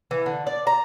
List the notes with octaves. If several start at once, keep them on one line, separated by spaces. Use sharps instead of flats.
E3
D3
D5
A#5